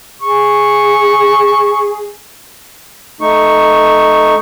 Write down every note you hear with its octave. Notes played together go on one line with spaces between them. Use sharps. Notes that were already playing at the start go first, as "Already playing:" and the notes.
G#4 C#6
A3 D#4 C#6